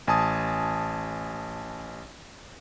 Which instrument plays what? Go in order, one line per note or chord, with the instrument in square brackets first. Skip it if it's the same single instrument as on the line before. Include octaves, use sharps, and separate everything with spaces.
[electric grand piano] A1 G#5 A5 D#6